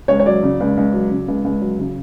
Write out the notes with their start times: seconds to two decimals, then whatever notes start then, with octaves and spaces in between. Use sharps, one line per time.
0.08 C#2 C#5
0.20 C#5
0.26 F#3 D5
0.43 C#3
0.60 C#2
0.77 C#2
0.93 F#3
1.11 C#3
1.28 C#2
1.44 C#2
1.61 F#3
1.79 C#3